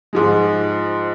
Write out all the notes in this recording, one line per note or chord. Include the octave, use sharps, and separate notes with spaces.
G#2 F3 G#3